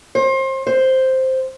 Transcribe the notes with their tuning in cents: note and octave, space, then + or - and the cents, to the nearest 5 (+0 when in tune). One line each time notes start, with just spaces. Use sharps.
C5 +30
C5 +0